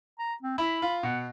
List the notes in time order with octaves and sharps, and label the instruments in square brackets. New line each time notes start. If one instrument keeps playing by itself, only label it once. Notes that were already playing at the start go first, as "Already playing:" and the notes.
[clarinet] A#5
C4
[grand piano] E4 [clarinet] B5
[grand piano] F4
[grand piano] B2 [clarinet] F#5